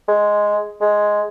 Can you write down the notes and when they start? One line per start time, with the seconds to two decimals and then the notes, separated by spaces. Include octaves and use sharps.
0.08 G#3
0.81 G#3